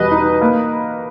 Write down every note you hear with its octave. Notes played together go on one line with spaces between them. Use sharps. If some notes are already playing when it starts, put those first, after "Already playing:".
Already playing: E2 B2 G3 B4 D#5
D#4
A#3